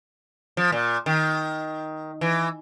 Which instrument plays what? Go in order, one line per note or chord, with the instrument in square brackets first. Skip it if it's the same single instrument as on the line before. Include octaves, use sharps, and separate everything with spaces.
[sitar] F3
A#2
D#3
E3